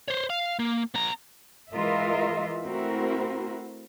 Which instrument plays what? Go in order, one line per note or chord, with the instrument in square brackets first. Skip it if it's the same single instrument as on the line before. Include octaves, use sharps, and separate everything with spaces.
[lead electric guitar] C5 C#5
F5
A#3
B3 A#5
[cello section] E3 G#3 F4 A#4 D#5 E5
A3 C4 E4 F#4 A#4